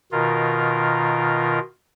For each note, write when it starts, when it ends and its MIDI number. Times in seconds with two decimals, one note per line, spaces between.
0.12 1.59 47
0.12 1.59 51
0.12 1.59 65
0.12 1.59 70